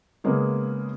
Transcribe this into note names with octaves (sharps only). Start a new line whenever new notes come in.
C#3 G#3 A#3 B3